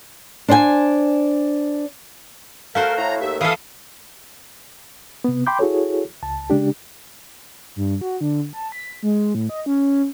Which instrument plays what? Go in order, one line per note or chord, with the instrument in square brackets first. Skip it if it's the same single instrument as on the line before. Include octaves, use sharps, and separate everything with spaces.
[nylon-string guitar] D4 C5 D5 G5 G#5
[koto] A3 F#4 C5 [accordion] A#4 [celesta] F5
[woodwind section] A2 [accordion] A#5
[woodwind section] D#2 [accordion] E5
[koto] E3 A4 [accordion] E5 F5 D#6
[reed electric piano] C3 B3
G5 B5 C6 D6 G6
E4 F#4 G#4 A4 C#5
C#2 A5
C#3 G#3 D4 G4
[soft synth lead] G2
F#4
D3
A5
B6
G#3
A2
D#5
C#4